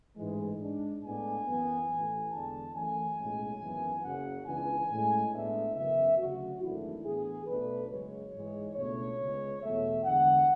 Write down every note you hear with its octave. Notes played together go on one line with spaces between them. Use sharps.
A1 G#2 E3 G#3
G#2 G#3 D4
A2 G#3 B3 D4 G#5
F#2 E3 B3
A1 A2 E3
E2 D3 G#3 D4 A5
F#2 E3 A3 C#4 G#5
B1 A2 G#3 C#4
G#1 F#2 E3 B3
F#1 F#2 C#3 F#3 F#5
C#2 C#3 E3 B3 D4 G#5
A2 G#3 C#4
A2 G#3 B3 D4 E5
F#2 C#3 E3 B3 E5
D2 C#3 F#3 F#4
G#1 F#2 E3 A3 D4 E4
A2 E3 B3 D4 G#4
B1 B2 F#3 A3 D4 B4
F#1 F#2 C#3 G#3 C#5
G#2 E3 G#3
C#2 B2 A3 D4 C#5
C#2 C#3 G#3 B3
E2 B2 F#3 A3 E5
E2 D3 G#3 D4 F#5